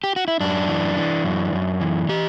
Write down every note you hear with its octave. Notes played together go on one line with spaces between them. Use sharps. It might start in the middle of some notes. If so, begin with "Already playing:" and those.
G4
F#4
E4
F#2 D4
E3
E3
F#2
F#2
E3
E3 G4